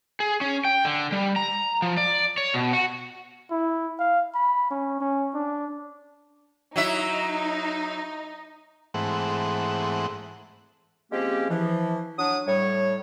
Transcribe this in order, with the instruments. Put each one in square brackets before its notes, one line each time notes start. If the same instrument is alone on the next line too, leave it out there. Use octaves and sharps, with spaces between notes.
[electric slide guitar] G#4
C#4
G5
D3
G3
A#5
F3
D5
C#5
B2
F#4
[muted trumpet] E4
F5
B5
C#4
C#4
D4
[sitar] F#3 E4 E5 [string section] D#4
[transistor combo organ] G#2 E3 A3 C4 F#5
[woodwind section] F3 G#3 A#3 C4 C#4 G4
E3 F3
F#3 D4 D#6
A2 G3 C#5